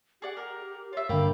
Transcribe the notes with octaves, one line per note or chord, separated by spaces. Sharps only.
G4 G#4 D5 F#5
A#4
F4 C#5 E5
G2 D3 A#3 G5 B5